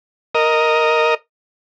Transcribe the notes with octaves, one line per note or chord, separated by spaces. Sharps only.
A#4 D#5